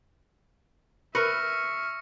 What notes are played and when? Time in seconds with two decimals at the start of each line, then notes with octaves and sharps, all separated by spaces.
1.15 A#4 B4 E5 C#6 F6 A#6 C#7